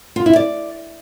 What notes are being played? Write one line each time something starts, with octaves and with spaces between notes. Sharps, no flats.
F4
E4
D5